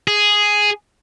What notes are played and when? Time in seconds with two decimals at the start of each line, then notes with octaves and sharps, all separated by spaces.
0.07 G#4